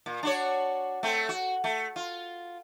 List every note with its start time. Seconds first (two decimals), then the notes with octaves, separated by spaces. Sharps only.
0.06 A#2
0.23 D4 F#4 C#5
1.03 A3 C4
1.29 F#4
1.64 A3
1.96 F4